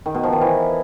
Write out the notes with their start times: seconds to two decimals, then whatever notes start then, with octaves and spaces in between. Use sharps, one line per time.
0.06 D#3
0.15 B2
0.24 F3
0.32 D#3
0.41 E3